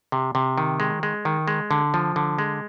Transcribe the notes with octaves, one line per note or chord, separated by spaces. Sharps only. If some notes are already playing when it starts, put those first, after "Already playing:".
C3
C3
D#3
G#3
G#3
D#3
G#3
D3
F3
D3
G#3